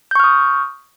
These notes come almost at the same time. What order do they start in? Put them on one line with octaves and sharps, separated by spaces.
G6 C#6 F6 D#6